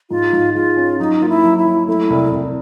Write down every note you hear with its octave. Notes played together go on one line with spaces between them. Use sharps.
G#2 F4
G#2
G#3 F4
C#4
F#3 D#4
A#3 F4
E4
F#3
E4
F#3
A3 E4
C2
C2